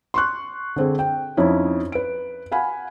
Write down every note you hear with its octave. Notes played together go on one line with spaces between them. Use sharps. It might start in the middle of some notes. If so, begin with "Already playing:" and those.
C6 C#6 F#6
D3 C4 G#4
G5
F2 C#4 D#4 E4
B4 D7
F5 F#5 G#5 B5